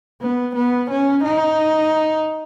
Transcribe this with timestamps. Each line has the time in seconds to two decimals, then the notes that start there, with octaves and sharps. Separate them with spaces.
0.22 B3
0.55 B3
0.90 C#4
1.24 D#4